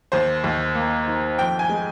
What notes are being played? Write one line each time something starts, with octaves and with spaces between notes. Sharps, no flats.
D#2 C5
D#2
A#3
D#3
F2 G5
G#5
G#3